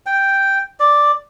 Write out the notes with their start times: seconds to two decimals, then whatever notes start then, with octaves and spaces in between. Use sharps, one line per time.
0.06 G5
0.80 D5